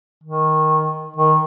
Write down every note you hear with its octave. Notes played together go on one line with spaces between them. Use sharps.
D#3
D#3